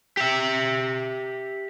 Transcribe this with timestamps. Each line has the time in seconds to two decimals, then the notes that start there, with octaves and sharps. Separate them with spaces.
0.17 G4 E5